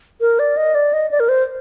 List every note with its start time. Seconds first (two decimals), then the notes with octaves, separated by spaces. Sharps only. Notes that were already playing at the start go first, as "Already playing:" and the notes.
0.21 A#4
0.39 D5
0.57 D#5
0.75 D5
0.93 D#5
1.11 D5
1.20 A#4
1.29 C5